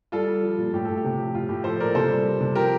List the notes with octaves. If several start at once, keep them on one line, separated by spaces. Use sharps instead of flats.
G3 F4 A4
G3
F3
A#2
A2 G4
A2 A4
G4
C3
F3
A2 F4
A2 G4
F3 A4 C5
A#2 A#4 D5
C3 A4 C5
G3
G3
C3
F3 G4 A#4